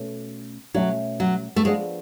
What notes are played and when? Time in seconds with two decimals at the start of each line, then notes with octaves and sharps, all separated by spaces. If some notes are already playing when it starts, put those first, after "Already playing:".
Already playing: B2 A3 C#4
0.74 B2 F#3 A3 C#4
1.20 F#3
1.56 A3
1.65 F3 G#3 B3 D4